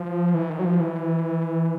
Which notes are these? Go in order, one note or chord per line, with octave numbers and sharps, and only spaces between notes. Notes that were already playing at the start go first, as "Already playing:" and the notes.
Already playing: F3
E3
D#3
F#3
F3
E3